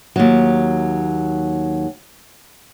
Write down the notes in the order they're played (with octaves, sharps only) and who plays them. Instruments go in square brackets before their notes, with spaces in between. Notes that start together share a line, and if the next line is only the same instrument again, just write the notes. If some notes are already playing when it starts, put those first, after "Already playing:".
[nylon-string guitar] D#2 F#3